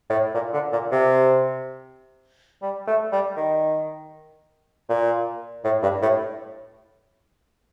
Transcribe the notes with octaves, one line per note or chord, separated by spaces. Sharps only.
A2
A#2
D3
A#2
C3
G3
A3
G3
D#3
A#2
A2
G2
A2